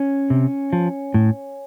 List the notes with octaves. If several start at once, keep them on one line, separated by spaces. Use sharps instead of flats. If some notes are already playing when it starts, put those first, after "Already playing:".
Already playing: C#4
C3
F3
A2